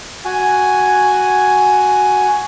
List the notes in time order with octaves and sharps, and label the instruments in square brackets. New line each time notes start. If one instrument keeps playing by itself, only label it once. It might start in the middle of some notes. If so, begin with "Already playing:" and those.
[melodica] F#4 G#5